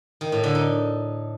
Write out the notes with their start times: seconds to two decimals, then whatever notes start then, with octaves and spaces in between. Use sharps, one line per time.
0.21 D#3
0.32 A2
0.44 D3
0.55 D#4